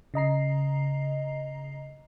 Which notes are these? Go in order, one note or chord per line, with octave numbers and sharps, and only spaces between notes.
C#3 D#5 A#5 C7